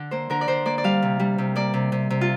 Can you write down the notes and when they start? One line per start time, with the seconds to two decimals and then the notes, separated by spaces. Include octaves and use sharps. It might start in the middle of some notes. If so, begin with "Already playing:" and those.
Already playing: D3 D5
0.11 A#3 C5
0.30 D3 A#4
0.41 D5
0.48 D3 C5
0.66 A#3 D5
0.78 D5
0.84 G3 F5
1.02 C3
1.19 G3
1.38 C3
1.56 A#3 D5
1.74 C3
1.92 C3
2.10 C3
2.21 F4